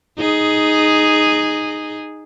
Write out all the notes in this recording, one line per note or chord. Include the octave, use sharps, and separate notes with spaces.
D#4 G#4